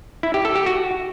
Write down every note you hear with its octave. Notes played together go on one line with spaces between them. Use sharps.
E4
G4
A4
G4
F#4